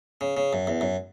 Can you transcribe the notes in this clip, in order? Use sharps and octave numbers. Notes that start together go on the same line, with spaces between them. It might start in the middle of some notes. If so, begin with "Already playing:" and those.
C#3
C#3
F#2
E2
F#2